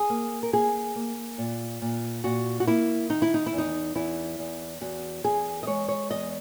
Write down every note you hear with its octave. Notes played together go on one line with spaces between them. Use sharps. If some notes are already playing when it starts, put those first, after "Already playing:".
Already playing: G#4
A#3
A#4
A#3 G#4
A#3
A#2
A#2
A#2 F#4
F#4
A#3 E4
D#3 D#4
E4
D#4
E4
E2
D#4
E2 E4
E2
E2 F#4
E2 G#4
D#5
G#3 C#5
C#5
E2 D#5